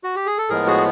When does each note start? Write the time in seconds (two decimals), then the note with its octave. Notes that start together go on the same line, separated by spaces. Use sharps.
0.04 F#4
0.16 G4
0.26 G#4
0.38 A4
0.49 A2 F3 G#3 B3 G#4 A#4
0.67 F#4 G#4